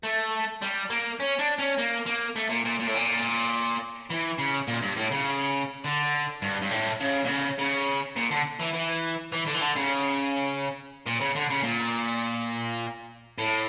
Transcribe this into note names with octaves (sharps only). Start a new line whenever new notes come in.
A3
G3
A#3
C#4
D4
C#4
A#3
A#3
A3
A#2
A#2
A#2
A2
A#2
E3
C#3
A#2
G2
A2
C#3
D3
G2
G2
A2
C#3
A#2
C#3
C#3
A#2
D3
E3
E3
E3
D3
E3
D3
C#3
A#2
C#3
D3
C#3
A#2
A2